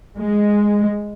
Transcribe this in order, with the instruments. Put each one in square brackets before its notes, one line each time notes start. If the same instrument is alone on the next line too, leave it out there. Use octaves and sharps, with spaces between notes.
[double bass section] G#3